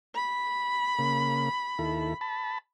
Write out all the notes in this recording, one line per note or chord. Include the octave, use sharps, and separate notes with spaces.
B5
C#3 A#3
D#2 E4 A4
A5 B5